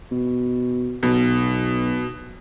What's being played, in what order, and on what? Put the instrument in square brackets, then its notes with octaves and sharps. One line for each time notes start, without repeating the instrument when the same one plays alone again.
[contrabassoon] B2
[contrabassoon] B1 [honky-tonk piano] B2